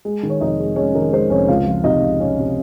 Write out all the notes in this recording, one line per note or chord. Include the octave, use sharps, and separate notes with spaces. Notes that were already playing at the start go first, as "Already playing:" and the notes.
G#3
D#3
C#5
F1 D#4 D#5
G#3
G#3 C#4 C#5
D#3 A#4
G#3 C5
F1 C#4 C#5
C#2 F4 F5
F3
C3 D#4 D#5
C#2
C3 C#4 C#5
C3